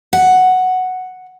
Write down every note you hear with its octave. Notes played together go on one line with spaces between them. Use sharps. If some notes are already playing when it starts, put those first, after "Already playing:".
F#5